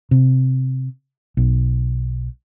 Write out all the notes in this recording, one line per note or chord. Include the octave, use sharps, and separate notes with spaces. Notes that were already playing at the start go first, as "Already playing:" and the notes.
C3
B1